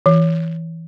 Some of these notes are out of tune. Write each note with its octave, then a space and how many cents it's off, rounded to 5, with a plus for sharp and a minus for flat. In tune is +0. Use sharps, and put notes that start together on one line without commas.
E3 -5